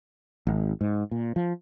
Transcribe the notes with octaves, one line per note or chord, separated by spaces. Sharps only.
G#1
G#2
A#2
F3